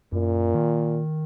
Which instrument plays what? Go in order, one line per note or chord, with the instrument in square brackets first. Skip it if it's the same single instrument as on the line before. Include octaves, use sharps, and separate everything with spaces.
[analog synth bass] F#2 [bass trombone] A#2
[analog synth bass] D#3